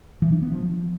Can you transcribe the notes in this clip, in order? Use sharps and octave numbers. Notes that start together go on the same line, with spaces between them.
E3
D4
B3
F3